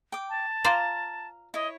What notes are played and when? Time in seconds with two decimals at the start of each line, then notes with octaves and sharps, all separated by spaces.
0.12 G5 D6
0.29 A5
0.64 F4 C5 D5 F5 A#5
1.54 E4 C#5 D#5